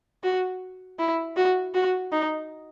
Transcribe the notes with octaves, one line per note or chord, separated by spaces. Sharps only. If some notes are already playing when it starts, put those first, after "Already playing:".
F#4
E4
F#4
F#4
D#4